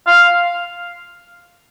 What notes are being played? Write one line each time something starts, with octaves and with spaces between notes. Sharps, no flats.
F5